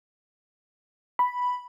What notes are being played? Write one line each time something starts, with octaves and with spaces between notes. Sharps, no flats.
B5